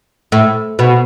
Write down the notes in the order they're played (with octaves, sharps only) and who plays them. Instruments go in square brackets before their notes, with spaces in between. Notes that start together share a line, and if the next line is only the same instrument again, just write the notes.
[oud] A2
B2